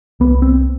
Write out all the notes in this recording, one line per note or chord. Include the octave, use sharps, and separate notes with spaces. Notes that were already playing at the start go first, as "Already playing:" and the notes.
C2 B3
C4